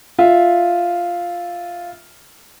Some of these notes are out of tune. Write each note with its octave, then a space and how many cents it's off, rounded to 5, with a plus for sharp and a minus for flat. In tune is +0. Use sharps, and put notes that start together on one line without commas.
F4 +0 E5 +0